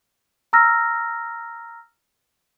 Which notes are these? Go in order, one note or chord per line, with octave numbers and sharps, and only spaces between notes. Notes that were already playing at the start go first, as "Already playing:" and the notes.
A#5 E6 F6 A#6